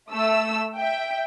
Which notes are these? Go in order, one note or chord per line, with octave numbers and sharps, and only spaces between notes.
A3 E6
E5 G5